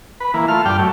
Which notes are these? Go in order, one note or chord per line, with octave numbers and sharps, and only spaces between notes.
B4
E3 A#3
A3 F4 F6
G2 D5 G5 F6
F#3 A3